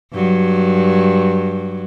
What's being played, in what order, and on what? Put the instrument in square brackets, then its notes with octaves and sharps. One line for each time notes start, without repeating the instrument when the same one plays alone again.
[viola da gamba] G2 F#3